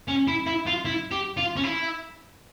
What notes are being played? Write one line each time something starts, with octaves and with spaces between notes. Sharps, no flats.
C#4
E4
E4
F4
E4
G4
F4
C#4
E4